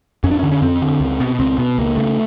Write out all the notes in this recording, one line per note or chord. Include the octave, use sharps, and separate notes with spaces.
F2 C#4
D4
C#4
D3
C#4
F2 C4
D3
C#2
B2
C#2 C4
B2 B3
C#2 A#3
C#3 A3